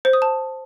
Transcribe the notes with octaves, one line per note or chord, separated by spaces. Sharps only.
C5
D#6
A5